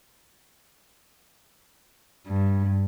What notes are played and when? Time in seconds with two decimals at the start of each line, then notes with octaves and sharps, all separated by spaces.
2.27 G2